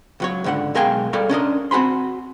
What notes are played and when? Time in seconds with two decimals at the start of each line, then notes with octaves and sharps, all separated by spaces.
0.20 C#2 F#3 C#5
0.44 C#2 G#2 D3 A#4 F#5
0.75 B1 G#3 A#4 F5 G5 G#5
1.13 G3 G4 A4 A#4 C#5 F5
1.29 C#4 D4 A#4 D#5
1.71 C4 F#4 G#5 B5 C6